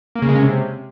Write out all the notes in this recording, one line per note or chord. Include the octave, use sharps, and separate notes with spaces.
A#3
C#3
G#3
C#4
C3